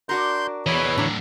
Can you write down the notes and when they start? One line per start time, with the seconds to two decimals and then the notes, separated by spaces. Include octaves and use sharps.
0.09 D4 F#4 A#4 C6 G6
0.67 E2 E3 B4 C#5 D#5 B5
0.98 A2 D3 D4 A#5